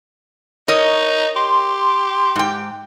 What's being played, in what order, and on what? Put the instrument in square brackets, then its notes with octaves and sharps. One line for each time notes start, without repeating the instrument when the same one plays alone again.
[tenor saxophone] D#4 [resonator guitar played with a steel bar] A#4 C#5 D#5
[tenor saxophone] G4 [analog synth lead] C6
[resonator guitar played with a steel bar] G#2 G5